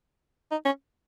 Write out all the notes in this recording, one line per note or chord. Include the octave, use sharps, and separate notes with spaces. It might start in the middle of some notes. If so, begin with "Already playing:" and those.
D#4
C#4